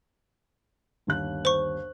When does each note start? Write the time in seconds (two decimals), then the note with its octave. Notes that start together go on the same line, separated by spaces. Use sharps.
1.07 G1 D#2 F#6
1.45 C5 C#6